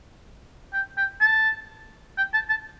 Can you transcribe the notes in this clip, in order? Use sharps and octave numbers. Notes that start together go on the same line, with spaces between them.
G5
G5
A5
G5
A5
A5